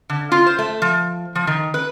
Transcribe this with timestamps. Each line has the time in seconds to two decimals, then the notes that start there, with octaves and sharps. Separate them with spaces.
0.10 D3
0.32 F4
0.47 C5
0.59 A3
0.82 F3
1.35 F3
1.47 D#3
1.74 B4